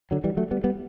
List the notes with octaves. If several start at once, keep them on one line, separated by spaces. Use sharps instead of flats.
D3 F#3
E3 G3
F#3 A3
G3 B3
G3 B3